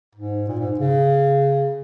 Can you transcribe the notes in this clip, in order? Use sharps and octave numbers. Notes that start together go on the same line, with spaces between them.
G#2
A#2
G#2
C#3